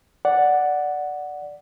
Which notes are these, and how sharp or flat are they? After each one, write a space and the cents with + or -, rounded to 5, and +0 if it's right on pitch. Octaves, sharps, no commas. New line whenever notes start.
D5 +0 F#5 +0